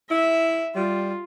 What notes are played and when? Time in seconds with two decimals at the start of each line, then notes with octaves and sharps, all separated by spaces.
0.11 E4 E5
0.76 G3 F4